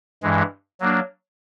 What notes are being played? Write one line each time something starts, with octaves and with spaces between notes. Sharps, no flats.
G2 E3 G#3
F#3 A#3 D4